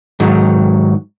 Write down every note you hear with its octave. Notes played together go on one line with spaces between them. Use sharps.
G#2 D#3 F#3